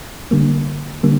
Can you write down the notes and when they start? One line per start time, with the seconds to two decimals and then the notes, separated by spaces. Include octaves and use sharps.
0.31 D3 G3 A#3
1.03 D3 G3 A#3